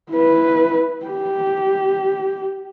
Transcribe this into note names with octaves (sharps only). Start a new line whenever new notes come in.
E4 B4
G4